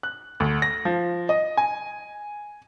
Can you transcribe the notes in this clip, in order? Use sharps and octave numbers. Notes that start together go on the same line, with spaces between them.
F#6
D2
A#6
F3
D#5
G#5